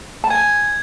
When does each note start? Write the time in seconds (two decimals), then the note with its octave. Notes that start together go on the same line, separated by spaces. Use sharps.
0.24 A5
0.30 G#5 G#6